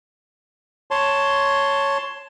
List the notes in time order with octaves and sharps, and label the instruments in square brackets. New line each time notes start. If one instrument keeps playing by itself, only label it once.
[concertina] C#5 A5 C6